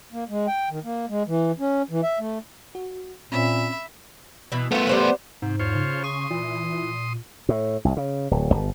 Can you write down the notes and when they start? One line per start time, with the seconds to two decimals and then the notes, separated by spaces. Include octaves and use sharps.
0.13 A#3
0.29 G#3
0.47 G5
0.70 D#3
0.85 A#3
1.09 G#3
1.27 E3
1.59 C#4
1.90 E3
2.03 E5
2.19 A3
2.75 F#4
3.32 A#2 C4 C#4 E5 B5
4.52 B2 E3
4.71 A3 B3 F4 F#4
4.87 G3 C5 F#5
5.42 G#2 C3
5.59 E2 F4 C5 C#5
5.75 C#3
6.04 C6 C#6 D#6
6.30 A#2 E3
7.49 A2
7.85 C2
7.97 C#3
8.31 D1
8.54 G1